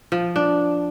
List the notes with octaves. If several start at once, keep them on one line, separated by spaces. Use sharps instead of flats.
F3
D4